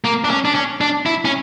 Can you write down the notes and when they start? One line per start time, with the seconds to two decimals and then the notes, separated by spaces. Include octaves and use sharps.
0.05 A#3
0.24 D4
0.30 C#4
0.45 D4
0.55 C#4
0.81 D4
1.06 E4
1.25 C#4